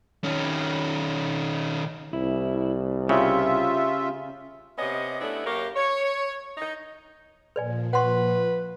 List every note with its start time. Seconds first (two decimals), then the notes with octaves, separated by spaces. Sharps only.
0.24 D#3 C#4
2.13 C2 E4
3.09 C#3 C#4 F4 G4 E5
4.78 C3 B3 C#4 D#5
5.20 A3 B3 C#4 D4 E4
5.46 F#2 A#3 G4 A#4 C#5
5.76 C#5
6.57 D#4
7.56 A#2 F3 B4 D5 G#5
7.93 B4 F#5 C6 C#6